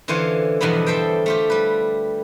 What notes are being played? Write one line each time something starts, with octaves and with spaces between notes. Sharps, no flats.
D3 E3 C#4 F4 C5 C#5
E2 G2 B2 D3 F3 B3
A4 C5 E5 G5
A3 F4 G4
G3 B4